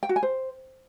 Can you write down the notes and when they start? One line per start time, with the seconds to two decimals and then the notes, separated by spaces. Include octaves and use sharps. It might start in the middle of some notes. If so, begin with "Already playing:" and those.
0.03 G5
0.09 F#4
0.16 G#5
0.23 C5